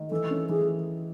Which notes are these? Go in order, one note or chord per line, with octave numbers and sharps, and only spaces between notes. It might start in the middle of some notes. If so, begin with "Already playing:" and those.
Already playing: D#3
E3 A4
C#4
E3 G#4